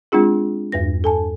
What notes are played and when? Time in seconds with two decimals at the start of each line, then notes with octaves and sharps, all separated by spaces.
0.12 G#3 C4 D4 F4 G#4
0.72 E2 G2 B4 A#6
1.04 A4 G#5 A5